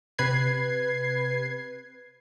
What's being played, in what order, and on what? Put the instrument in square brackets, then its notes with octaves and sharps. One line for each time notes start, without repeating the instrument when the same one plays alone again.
[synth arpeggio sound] C3 B4 G#6 C7